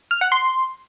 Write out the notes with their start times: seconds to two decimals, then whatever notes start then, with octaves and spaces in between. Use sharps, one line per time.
0.11 F6
0.21 F#5
0.32 C6